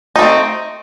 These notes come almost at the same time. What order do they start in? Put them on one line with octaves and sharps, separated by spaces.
D#4 A3 C4